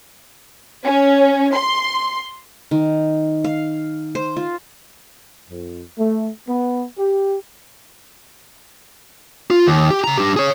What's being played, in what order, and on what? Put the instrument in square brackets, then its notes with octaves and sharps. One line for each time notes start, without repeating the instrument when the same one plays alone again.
[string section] C#4
C6
[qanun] D#3
F5
C5
F4
[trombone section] F2
A3
B3
G4
[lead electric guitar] F4
D#2
G4
C#3 A#5
D4 G4
G#4 C#5